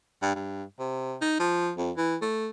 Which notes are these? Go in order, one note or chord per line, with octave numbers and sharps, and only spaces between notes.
G2
G2
C3
D#4
F3
F2
E3
A3